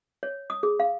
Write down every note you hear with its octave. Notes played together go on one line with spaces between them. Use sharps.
C#5
D#6
G#4
F5